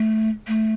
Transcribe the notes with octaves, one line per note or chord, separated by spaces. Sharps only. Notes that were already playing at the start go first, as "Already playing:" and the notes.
Already playing: A3
A3